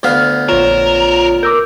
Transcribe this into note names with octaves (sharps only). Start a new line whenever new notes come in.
D2 B3 F5
A#1 F4 A#4 C#5 E7
A#4 D6 E6 G6